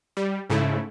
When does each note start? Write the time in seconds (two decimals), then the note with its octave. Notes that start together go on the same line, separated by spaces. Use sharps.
0.17 G3
0.50 G#2 C#3 A3 E4